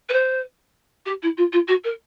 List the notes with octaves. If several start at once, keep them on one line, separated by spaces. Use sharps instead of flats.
B4
C5
G4
E4
F4
F4
F#4
A#4